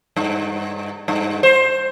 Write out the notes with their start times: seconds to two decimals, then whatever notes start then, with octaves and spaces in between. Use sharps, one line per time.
0.16 G2
1.08 G2
1.43 C5